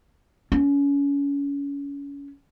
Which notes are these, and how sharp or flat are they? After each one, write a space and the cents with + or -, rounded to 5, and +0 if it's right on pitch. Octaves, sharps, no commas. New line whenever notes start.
C#4 +30